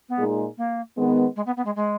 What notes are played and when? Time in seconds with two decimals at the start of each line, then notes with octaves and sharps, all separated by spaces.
0.09 B3
0.18 A#2 G#3 D#4 G#4
0.58 A#3
0.97 D#3 G#3 B3
1.36 G#3
1.46 B3
1.57 B3
1.65 G#3
1.76 G#3